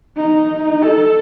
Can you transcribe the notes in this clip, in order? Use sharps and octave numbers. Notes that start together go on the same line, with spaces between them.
D#4
A4